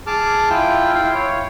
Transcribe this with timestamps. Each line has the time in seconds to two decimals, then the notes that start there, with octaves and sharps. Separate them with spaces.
0.07 G#4 A5 D6 F6
0.50 E4 F4 G5
0.95 E4 F5 G5
1.14 C#5